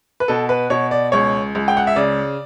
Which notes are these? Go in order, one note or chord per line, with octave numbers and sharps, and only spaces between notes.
B4
B2 A4
B4
B2 C#5
D5
C#2 C#5
C#2
G5
F#5
E5
C#3 D5